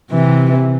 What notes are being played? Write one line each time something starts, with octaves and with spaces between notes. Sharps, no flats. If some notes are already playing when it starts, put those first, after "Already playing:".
C3 E3